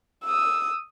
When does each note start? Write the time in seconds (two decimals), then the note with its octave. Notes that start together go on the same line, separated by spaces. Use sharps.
0.25 D#6 E6